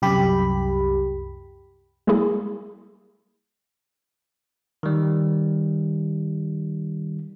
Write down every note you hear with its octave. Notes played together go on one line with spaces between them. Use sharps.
C2 F#2 G4 B5
G3 G#3 A#3 E4 G#4
D#3 G3